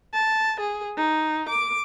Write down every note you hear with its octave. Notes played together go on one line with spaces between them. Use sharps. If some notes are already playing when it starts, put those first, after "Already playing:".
A5
G#4
D#4
D6